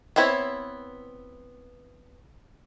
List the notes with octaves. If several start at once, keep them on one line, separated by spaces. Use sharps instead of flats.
B3 C4 E4 B4 C#5